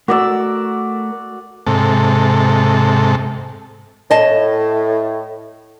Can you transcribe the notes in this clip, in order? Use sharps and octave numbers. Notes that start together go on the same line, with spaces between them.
A3 F#4 A#4 D5 E6
G#2 C3 A4
A2 D#5 A5